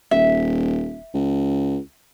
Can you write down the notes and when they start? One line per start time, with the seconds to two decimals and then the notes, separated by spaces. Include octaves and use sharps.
0.11 D#1 E5
1.14 C#2